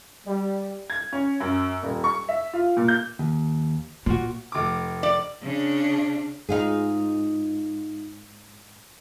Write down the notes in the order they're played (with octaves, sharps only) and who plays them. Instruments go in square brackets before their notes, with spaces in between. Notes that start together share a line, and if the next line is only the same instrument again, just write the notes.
[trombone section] G3
[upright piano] G#6
C#4
F#2
D#1
C#6
E5
F4
A#2
G6
[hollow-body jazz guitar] D#2
[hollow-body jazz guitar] A#2 F#4 [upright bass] A#3
[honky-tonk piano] F1 D6
[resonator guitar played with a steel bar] D5
[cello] C#3 D4
[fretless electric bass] G#2 [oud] D#4 F4 G#4